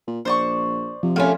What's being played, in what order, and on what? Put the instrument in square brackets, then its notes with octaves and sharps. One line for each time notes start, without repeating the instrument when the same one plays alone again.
[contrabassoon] A#2
[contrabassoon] A#1 [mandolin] C5 D5 C#6
[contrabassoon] C3 [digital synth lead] F3
[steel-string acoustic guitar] A3 C#4 [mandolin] A#3 F4 B5